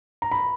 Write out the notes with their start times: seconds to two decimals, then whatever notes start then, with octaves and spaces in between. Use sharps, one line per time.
0.22 A#5
0.31 B5